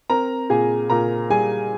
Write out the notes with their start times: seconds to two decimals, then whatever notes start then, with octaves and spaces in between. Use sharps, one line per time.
0.10 C4 A#4 A#5
0.50 A#2 G#4 G#5
0.90 A#2 A#4 A#5
1.30 G3 G#4 G#5